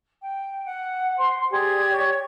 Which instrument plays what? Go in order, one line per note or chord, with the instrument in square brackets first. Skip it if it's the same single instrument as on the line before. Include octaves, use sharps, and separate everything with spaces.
[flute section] G5
F#5
[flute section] C5 [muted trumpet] C6
[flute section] G4 D5 G#6 [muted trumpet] G#4
[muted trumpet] C#5